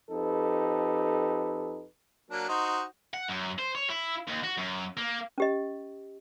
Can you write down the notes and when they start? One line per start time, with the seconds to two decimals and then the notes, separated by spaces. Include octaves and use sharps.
0.11 F2 D#4 G4 A4 B4
2.31 F#3 A#3 D4
2.49 D#4 F#4 C5
3.14 F#5
3.28 F#2
3.59 C5
3.75 C#5
3.90 E4
4.27 D#2
4.43 F#4
4.57 F#2
4.97 A#3
5.38 C#4 G4 D#5